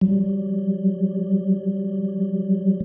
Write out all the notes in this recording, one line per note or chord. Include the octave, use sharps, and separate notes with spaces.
F#3 G3